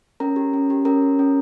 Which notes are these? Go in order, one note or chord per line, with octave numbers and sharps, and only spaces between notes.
C#4 A#4 A#5
G4
C#4
G4
C#4 A#4 A#5
G4
C#4